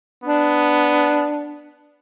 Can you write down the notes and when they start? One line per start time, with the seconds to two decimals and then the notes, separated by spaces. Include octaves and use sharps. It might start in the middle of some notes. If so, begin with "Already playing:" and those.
0.24 B3 D4